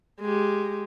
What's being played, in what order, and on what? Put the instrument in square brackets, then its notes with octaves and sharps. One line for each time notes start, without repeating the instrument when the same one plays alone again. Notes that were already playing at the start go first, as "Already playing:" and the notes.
[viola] G#3 G4